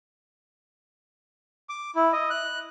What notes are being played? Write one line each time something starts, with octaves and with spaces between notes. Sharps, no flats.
D6
E4
D#5
F#6